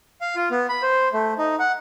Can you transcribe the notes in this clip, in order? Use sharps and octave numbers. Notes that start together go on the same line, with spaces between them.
F5
F4
B3
B5
C5
A3
D#4
F#5